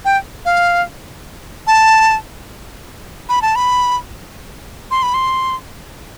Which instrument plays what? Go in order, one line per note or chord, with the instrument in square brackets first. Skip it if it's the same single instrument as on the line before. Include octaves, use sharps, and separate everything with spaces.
[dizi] G5
F5
A5
B5
A5
B5
C6
B5
C6